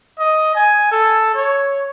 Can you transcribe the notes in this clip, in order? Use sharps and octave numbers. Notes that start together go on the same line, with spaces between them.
D#5
G#5
A4
C#5